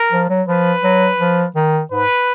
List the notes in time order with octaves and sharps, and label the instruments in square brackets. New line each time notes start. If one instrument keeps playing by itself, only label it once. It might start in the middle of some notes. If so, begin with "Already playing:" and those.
Already playing: [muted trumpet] A#4
[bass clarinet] F3
F#3
[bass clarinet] F3 [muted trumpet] B4
[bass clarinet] F#3
F3
D#3
[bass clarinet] G#2 [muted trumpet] B4